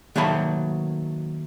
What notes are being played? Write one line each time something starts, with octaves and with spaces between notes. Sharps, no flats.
D#3 F#3 A3 A#3 A5 B5